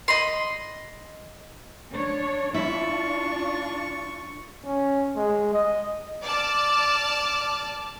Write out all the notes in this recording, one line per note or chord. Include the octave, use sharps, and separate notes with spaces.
D#5 B5 C6
D4 C#5
D4 E4 F4 E5 C#6
C#4
G#3
D#5
D5 A5 D6 F6